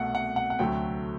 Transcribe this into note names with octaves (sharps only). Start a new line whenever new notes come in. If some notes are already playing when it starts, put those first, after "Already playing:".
Already playing: C2 B2 A3 F#5
F#5
F#5
F#5
D2 C3 F#3 A3 G5